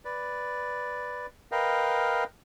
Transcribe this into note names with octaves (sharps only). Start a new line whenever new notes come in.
B4 D5
A#4 B4 D#5 F5 G5